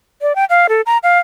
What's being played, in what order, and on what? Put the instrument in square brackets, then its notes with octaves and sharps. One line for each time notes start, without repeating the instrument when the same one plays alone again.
[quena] D5
G5
F5
A4
A#5
F5